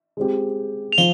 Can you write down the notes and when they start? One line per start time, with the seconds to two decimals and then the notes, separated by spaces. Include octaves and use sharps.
0.17 G#3 C4 G4
0.92 F7
0.98 F3 G7